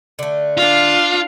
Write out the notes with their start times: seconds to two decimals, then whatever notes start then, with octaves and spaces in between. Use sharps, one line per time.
0.19 D3 A3
0.57 D4 F4 F5